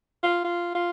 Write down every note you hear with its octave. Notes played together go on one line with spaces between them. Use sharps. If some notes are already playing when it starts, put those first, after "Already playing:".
F4
F4
F4